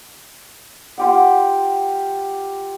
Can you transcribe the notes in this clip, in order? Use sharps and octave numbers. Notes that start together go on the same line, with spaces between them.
F4 G4 F#5